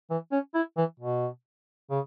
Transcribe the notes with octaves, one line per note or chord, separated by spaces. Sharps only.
E3
C#4
E4
E3
B2
C#3